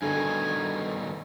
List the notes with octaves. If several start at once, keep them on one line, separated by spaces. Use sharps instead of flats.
G2 B2 D3 D#3 G#5